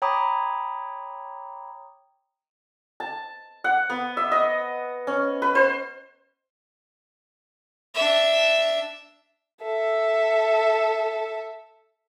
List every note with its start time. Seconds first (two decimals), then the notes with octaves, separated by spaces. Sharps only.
0.02 C#5 G5 A#5 B5 D6 D#6
3.00 A5
3.64 F#5
3.90 B3
4.17 E5
4.31 D#5
5.07 C#4
5.42 B4
5.55 C5
7.95 D4 E5
9.63 A4 E5